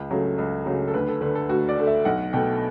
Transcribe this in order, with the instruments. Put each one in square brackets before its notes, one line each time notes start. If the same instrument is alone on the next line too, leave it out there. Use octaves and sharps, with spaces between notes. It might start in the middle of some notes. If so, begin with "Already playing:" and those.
Already playing: [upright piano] C#2
C#3 F#3 A3
C#2
C#3 F#3 A3
A4
D2 B4
A4
D3 A3 B4
A4
D2 F#4
D5
D3 A3
E5
B1 F#5
B2 A3 G5